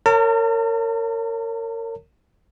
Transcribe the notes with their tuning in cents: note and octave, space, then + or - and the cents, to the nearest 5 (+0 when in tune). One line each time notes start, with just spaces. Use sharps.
A#4 -30 C#5 +0 A5 +45